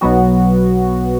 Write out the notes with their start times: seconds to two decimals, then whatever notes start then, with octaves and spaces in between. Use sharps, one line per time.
0.01 B1 B2 F#3 B3 F#4